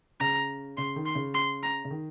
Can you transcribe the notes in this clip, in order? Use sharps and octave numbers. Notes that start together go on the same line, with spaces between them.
C#3 A#5
C#3 C6
D#3
C6
C#3
C6
A#5
C#3
D#3